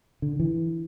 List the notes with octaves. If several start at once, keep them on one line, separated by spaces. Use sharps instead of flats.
D3
E3